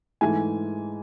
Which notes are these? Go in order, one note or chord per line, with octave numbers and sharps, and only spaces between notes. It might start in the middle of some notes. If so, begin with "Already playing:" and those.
G#2 E3 A3 G#5